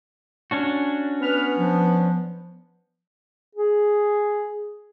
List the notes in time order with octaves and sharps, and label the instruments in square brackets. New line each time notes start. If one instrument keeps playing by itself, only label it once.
[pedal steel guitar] C#4 D4 F#4
[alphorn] B3 [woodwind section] B4 F6
[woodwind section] F3
[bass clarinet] G#4